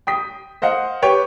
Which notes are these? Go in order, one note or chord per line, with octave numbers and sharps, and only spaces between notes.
G5 D#6 B6
C5 D#5 F5 F#5
G4 B4 C#5 G5